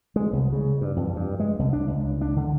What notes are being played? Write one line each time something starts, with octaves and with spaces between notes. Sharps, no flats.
G#3
C2
C#3
G2
F2
G2
G#3
C2
D4
C#2
D4
D3